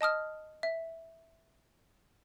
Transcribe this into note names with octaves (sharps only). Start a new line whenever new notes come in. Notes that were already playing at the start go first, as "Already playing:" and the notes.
D#5 A5 D#6 F6
E5